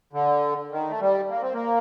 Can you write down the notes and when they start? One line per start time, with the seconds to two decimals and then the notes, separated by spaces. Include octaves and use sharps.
0.13 D3
0.71 D#3
0.90 A3
1.01 G3
1.30 A#3
1.42 C4
1.53 A#3